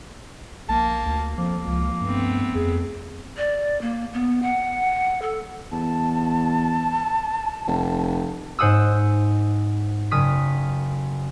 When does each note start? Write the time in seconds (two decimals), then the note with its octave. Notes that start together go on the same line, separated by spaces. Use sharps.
0.69 A#1 A#3 A5
1.06 D2
1.38 F2 F3 A#3
1.67 C#2 F3
2.02 G2 A3 B3 C4
2.55 F2 G#4
3.37 D5
3.81 A#3
4.14 B3
4.43 F#5
5.22 A4
5.72 E2 A5
7.67 F1
8.59 G#2 C5 F#5 D#6 E6
10.11 F#1 D#6 F6 B6